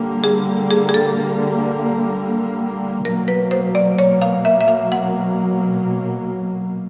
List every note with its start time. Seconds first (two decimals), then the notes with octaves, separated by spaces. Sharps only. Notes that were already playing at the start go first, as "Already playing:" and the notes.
Already playing: D3 G3 A#3
0.24 G#4
0.71 G#4
0.89 G#4
0.94 A4
3.04 B2 F#3 A#3 A#4
3.28 B4
3.51 C5
3.75 D5
3.99 C#5
4.22 F5
4.45 E5
4.61 E5
4.68 F5
4.92 F#5